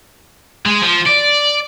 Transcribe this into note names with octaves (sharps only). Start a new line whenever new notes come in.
G#3
F3
D5